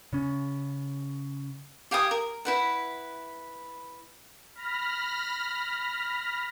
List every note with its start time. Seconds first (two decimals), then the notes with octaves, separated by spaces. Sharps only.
0.13 C#3 C#4
1.91 G4 F5 G#5 D#6
2.11 A#4
2.45 E4 B4 F#5
4.55 B5 F6 A#6